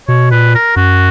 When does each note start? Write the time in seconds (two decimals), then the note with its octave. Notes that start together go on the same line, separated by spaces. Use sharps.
0.08 B2 C#5
0.31 A#2 B4
0.55 A#4
0.76 F#2 F#4